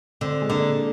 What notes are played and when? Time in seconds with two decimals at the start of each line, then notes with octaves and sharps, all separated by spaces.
0.21 D3 C4
0.42 G#3
0.50 D3 A#3